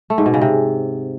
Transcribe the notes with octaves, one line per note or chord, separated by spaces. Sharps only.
A3
G#2
B2
C#3
C3